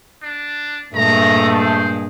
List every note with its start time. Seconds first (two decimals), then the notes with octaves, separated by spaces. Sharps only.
0.23 D4
0.95 G2 A#2 G#3 A3 A#5
1.59 C5